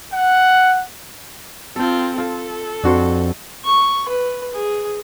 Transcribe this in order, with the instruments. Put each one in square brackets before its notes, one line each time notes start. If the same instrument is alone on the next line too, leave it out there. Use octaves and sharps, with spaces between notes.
[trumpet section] F#5
[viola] C4 F4 [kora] A4 G5
[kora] F4 [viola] A4
[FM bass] F2 [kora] D4 F#4 C5
[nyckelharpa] C#6
B4
G#4